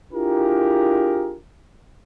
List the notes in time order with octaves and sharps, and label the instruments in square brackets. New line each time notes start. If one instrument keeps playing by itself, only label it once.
[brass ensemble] D4 E4 F4 G4 G#4 A#4